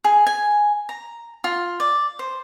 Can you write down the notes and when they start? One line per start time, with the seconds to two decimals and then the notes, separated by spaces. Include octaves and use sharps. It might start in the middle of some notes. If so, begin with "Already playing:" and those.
0.04 G#4
0.27 G#5
0.89 A#5
1.44 F4
1.80 D5
2.19 C5